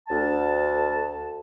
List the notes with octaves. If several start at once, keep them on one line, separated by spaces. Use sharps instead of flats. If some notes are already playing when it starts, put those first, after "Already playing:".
D2 A5